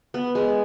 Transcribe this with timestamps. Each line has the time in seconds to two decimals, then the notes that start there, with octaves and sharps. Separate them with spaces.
0.14 B3
0.35 G#3